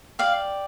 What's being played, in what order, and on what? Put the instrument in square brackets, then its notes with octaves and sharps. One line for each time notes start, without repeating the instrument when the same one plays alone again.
[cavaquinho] G4 D5 F5